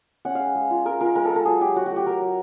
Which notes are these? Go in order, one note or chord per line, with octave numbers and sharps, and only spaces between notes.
C#4 F#5
G#3 F5
G#3
F4
G#3 A#4
F4 A#4
G#3 A#4
A4
G#3
A4
F#3 G#4
F#3 G4
F#3 F#4
A3 F#4
G4
F#3 A#4
F#3